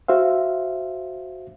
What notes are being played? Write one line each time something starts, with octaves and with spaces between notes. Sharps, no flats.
F#4 C5 E5 F5